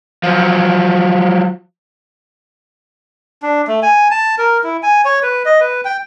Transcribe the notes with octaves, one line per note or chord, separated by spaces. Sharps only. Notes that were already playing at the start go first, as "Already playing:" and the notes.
F3 F#3
D4
A3
G#5
A5
A#4
E4
G#5
C#5
B4
D#5
B4
G5